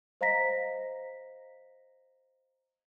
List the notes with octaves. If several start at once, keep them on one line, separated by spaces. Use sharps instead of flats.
C5 D#5 F5 A#5 A#6 B6